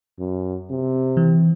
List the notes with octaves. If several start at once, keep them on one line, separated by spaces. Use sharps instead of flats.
F#2
C3
E3